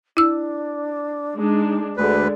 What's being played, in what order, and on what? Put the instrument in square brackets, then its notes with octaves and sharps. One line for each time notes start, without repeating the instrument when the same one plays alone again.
[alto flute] D4 [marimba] E4 E6
[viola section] G#3 D4 [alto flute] D#4
[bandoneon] D2 B4 [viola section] D3 G#3 [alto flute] D5